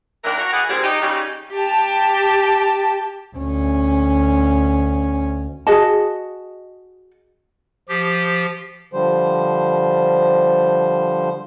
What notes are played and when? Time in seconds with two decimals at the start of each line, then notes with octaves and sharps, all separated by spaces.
0.24 D#2 E3 D4 A#4
0.38 F#4 A#4
0.52 E3 E4 G#4 D5 F#5
0.68 A#2 D3 G3 C4 G4 G#4
0.83 D#4 G4
1.01 C#3 G3 D#4
1.56 G4 A5
3.36 D2 C#4
5.67 F#4 G#4 D#5 A5
7.89 F3 G4
8.93 D3 F3 G3 C5